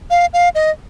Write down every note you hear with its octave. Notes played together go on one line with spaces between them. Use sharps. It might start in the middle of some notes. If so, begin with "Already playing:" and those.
F5
F5
D#5